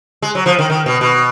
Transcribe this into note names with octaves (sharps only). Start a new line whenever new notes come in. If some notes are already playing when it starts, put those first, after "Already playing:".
G#3
F#3
F3
D#3
D#3
B2
B2